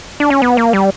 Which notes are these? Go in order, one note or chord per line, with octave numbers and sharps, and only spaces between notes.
D4
C#4
B3
A#3
G3